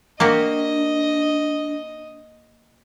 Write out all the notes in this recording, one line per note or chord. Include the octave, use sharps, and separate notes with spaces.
A#3 D4 F#4 G4 D#5